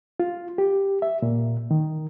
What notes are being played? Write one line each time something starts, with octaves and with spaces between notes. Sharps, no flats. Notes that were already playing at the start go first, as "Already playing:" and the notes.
F4
G4
E5
A#2
D#3